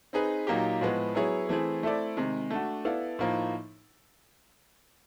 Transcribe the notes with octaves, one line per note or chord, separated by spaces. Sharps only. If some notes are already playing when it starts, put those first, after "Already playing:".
C4 D#4 G#4 B4
A#2 F#3 A#3 D#4 G4
A2 F3 G#3 B3
F#3 B3 E4 G#4 C#5
E3 A3 C4 E4 G#4
A3 C4 E4 A4 D5
C3 D#3 G#3
A3 D4 F#4
B3 E4 A4 D5 F5
A2 F3 A#3 D#4